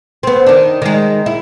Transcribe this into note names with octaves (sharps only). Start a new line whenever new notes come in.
B3 C4
D#3 D4
D#3 G#3
E4